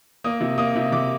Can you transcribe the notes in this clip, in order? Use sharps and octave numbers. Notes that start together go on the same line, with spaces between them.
A#3 D#6
C3
A#3 D#6
C3
C3 D6